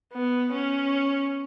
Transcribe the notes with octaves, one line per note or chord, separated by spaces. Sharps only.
B3
C#4